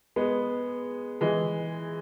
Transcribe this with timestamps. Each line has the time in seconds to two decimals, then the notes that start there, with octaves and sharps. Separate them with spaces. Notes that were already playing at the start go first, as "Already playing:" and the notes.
0.16 G#3 B3
1.21 E3 G#3